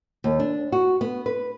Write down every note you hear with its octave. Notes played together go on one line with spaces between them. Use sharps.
D#2
D4
F#4
B3
B4